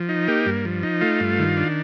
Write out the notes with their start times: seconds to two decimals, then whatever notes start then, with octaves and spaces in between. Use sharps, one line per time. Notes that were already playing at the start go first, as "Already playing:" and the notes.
Already playing: F3
0.09 D#4
0.28 A#3 G4
0.46 G2
0.65 F3
0.83 D#4
1.01 A3 F4
1.20 G2
1.39 D#3
1.57 D4